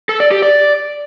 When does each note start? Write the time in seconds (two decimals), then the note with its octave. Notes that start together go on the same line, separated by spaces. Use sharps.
0.09 A4
0.20 D5
0.31 G4
0.42 D5